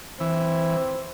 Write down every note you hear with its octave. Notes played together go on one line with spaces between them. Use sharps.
E3 C4